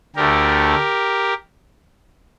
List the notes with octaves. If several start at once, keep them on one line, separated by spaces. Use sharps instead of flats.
D2 D3 A3 G4 A#4